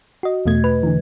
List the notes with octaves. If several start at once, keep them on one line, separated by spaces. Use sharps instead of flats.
F#4 D#5
E2 B2 A3 G#6
B4
D3 E3